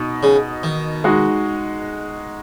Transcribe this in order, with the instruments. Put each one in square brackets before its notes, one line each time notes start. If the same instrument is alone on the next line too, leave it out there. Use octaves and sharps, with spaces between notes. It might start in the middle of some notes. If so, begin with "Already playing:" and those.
Already playing: [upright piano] B2 D#4
[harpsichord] C#3
D#3
[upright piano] G#3 D#4 F#4